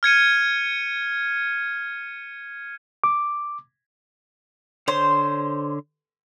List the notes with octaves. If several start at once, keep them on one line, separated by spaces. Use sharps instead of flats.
F6 G#6 C#7 D#7
D6
D3 C5 C#5 C6